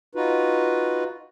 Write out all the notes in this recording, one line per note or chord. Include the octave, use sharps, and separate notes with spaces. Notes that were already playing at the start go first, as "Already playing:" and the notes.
D#4 F4 F#4 B4